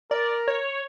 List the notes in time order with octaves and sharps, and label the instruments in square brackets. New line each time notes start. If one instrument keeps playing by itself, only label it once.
[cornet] A#4 [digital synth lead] D5
[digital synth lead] C#5